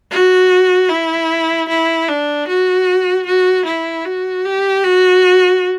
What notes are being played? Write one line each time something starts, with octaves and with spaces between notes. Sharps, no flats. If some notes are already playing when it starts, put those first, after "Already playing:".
F#4
E4
E4
D4
F#4
F#4
E4
F#4
G4
F#4